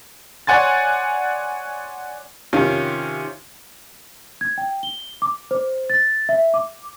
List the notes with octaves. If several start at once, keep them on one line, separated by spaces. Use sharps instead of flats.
C#5 D5 F#5 G#5 C6 A6
C3 D#3 C#4 F4
G#6
G5
G7
D6
C5
A6
E5
D6